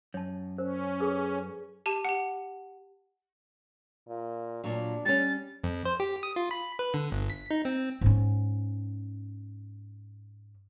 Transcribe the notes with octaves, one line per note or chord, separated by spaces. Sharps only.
F#2 C#5 A5
C#4 A#4 C5
G#4 A4 B4
G4 A5 D#7
G4 F#5
A#2
A#2 F#3 D4
G3 C#4 A6
F2
C5
G4
D#6
F4
B5
B4
D3
G1
B6
D#4
C4
G#2 C#4